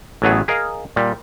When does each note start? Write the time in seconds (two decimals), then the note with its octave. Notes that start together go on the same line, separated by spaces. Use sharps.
0.22 A1 A2 F#3 B3 G#4
0.48 G#4 A#4 D#5 F5
0.96 A#2 G3